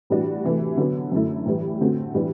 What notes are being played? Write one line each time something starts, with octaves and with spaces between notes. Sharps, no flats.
A2 E3 G3 D4 F#4
C3 E3 A3
D3 F#3 B3
F#2 D3 A3 E4
A2 E3 G3
D3 A3 C4 F#4
A2 E3 G3 D4